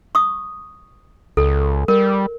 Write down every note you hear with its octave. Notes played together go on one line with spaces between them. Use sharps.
C#6 D#6
C#2 A4
G3 A#4